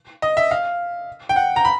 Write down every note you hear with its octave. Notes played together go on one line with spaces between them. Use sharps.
D#5
E5
F5
G5
F#5
A#5
B5